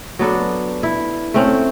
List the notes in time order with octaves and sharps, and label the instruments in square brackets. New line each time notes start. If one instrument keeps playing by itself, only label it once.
[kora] F#3 B3 D4 A4
E4
A3 C4 C#4